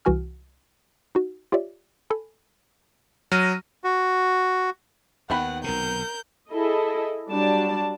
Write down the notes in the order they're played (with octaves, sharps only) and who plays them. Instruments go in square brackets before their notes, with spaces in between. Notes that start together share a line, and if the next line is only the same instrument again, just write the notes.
[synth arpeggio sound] C2 E3 F#4 G#5 F6
D#4 F#4
F4 G4 C#5 D5 E5
A4 G#5 B5
[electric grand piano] F#3 [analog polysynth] F6 A#6 D#7
[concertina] F#4
[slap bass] D#2 [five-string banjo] D#3 B3 B5 [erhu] F#5
[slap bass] B1 C3 [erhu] A#4 [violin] G6
[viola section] E4 G#4 A4 D#5
F#3 G3 D4 D5 A5